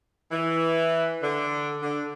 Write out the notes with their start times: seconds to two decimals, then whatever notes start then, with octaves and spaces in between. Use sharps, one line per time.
0.31 E3
1.23 D3
1.82 D3